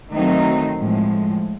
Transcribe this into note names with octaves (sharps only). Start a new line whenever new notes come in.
D#3 F#3 A3 C4 D#4
A2 F3 G#3